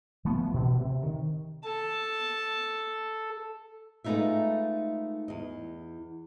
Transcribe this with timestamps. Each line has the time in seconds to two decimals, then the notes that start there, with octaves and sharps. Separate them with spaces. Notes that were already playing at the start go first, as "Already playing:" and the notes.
0.25 E3 F3 A3 B3
0.51 D2 B2
0.79 C3
1.06 D#3
1.64 A4 A5
4.04 G#3 A3 B3 D#4 F4 E5
5.28 E2 D#5